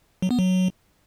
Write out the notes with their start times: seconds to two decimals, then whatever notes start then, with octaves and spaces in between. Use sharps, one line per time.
0.22 F#3
0.31 B3
0.39 F#3